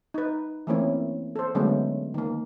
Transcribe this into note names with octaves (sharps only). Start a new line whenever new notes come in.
D#4 B4
E3 A3 A#3 C4 C#4 E4
A4 C5
D3 F#3 G#3 A3 B3 C#4
D#3 A#3